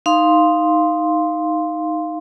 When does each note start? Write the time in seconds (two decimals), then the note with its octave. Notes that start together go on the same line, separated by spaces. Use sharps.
0.06 D#4 F5 C6